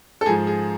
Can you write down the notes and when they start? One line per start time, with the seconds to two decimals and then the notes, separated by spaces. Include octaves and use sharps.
0.21 A4
0.26 G#2 F3 G#4
0.47 G#4